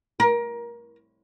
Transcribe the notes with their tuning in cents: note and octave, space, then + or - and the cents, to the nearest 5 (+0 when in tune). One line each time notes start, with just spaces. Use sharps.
A#4 +25